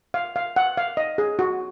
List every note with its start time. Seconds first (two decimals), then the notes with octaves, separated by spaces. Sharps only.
0.14 F5
0.36 F5
0.56 F#5
0.77 F5
0.97 D#5
1.18 G#4
1.39 F#4